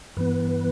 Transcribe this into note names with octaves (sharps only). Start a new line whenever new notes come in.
G2 E3 B3 B4